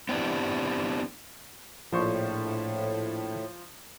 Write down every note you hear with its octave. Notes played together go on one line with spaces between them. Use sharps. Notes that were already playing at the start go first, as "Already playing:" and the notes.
B3 C4 D4 E4 G4
A#1 A2 F3 C5 C#6